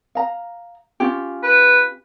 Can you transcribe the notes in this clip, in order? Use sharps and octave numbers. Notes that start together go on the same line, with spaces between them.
F5 A#5
C#4 F4 G4
B4